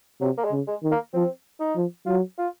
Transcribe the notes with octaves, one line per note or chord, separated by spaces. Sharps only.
C3 F#3
A#3
G#3
C#3
G#3
D#3
A#3
F3 C4
D#4
F3
F#3 F4
F4